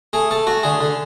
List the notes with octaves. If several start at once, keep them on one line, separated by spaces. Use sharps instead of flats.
A3 G#4
A3 A4
A3 F#4
D3 G#4
D3